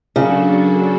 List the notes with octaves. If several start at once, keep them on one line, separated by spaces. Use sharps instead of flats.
C#3 F#3 A#3 D4 F#4 A4